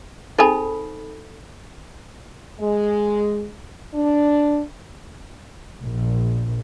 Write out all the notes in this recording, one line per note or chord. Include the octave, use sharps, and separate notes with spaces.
C4 D#4 G#4 A4 B5
G#3
D4
A#1